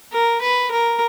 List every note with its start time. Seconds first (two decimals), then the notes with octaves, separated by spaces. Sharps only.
0.13 A#4
0.41 B4
0.71 A#4